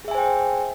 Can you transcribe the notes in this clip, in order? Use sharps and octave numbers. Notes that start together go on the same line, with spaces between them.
G#4 C5 E5 G5 G#5